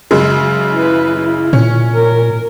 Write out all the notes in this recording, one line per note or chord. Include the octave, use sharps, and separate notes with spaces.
F#2 C#3 G#3
E4 B4
E4
A#2 C#4
A#4